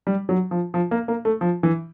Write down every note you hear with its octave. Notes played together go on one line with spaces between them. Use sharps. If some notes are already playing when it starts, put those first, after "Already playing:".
G3
F#3
F3
F3
A#3
A#3
A3
F3
E3